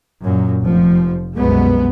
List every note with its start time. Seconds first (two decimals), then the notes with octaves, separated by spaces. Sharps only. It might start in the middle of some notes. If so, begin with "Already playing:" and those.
0.24 F#2 A#2
0.63 F1 F3
1.36 C2 F#2 B2 G#3 B3